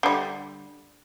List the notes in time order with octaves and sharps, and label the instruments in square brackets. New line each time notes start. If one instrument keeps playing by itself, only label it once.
[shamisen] D3 G3